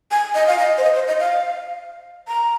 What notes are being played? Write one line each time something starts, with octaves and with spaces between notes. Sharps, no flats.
G#5
D#5
F5
D#5
C5
D#5
C5
D#5
F5
A#5